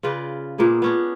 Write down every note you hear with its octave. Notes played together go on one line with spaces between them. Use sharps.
C#3 F4 B4 D5
A#2 A#3 B3 G#4
B3 C#4 D4